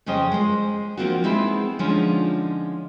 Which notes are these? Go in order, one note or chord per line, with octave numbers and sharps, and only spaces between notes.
F2 C#3 C#4 C5 D#5 G5
G#3 C5
F3 A#3 C4 D4 F4 F#4
G#3 B3 C4 D#4 E4 G#4
D3 F3 G#3 C#4 D#4 F4